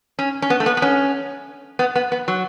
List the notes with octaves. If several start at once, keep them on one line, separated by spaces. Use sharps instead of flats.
C#4
C#4
B3
A3
B3
B3
C#4
B3
B3
B3
F#3